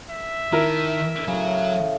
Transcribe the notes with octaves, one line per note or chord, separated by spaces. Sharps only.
E5
D#3 E4 A#4 A5
A2 C#3 F#3